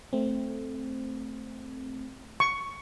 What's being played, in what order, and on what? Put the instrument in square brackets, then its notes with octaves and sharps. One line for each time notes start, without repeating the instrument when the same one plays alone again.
[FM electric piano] A3 C4
[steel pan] C#6